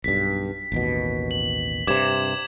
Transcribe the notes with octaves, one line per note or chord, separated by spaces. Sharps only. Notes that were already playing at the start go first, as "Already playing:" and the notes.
B1 G2 B6
A1 D#2 B2
F#7
G2 C3 D6 G#6 E7